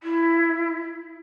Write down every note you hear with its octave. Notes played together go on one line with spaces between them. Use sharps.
E4